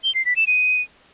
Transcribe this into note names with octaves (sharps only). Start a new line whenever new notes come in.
G7
C7
B6
E7
D#7